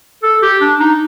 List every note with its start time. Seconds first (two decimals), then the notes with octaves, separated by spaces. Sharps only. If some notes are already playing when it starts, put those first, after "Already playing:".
0.23 A4
0.42 G4
0.61 D4
0.80 D#4